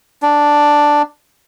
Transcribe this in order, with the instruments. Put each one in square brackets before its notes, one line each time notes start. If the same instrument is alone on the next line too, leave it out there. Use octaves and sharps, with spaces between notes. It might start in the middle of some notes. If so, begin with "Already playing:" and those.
[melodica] D4